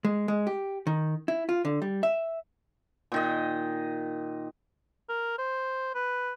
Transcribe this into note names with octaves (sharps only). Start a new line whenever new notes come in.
G#3
G#3
G4
D#3
E4
F4
D3
G3
E5
A#2 D#3 D#5
A#4
C5
B4